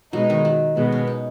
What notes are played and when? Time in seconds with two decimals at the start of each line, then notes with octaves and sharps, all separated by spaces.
0.13 B2 F#3 G#3 D#4
0.30 D#3
0.45 F#3
0.77 B2 F#3 G#3 B3
0.92 C#4
1.07 D#4